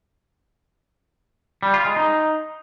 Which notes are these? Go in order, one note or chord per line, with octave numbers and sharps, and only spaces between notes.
G3
F4
G#3
D#4